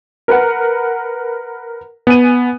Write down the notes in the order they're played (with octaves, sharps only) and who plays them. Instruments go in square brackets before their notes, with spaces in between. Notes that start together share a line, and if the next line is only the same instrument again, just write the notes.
[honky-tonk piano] A#4 B4 F#5
[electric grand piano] B3 [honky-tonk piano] G#5 D#7